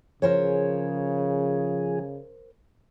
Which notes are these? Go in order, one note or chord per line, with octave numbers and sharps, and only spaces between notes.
C#3 F3 G#4 A#4 C5 C#5